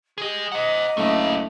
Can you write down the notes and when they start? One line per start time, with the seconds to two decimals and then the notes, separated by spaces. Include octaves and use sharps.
0.18 G4 G#4 D#5
0.52 C5 D#5 F#5 A#5 D6
0.97 F#1 A2 A3 F5